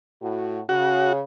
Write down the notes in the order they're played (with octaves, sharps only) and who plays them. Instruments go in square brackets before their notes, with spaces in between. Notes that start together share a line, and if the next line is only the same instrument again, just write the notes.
[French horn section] A2 F#4
[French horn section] C#3 [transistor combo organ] F#4